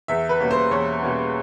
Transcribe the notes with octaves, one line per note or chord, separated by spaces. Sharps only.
E2 E5
B4
B2 G3 A#3 C#4
C5
E2 C#5
B2 G3 A#3 C#4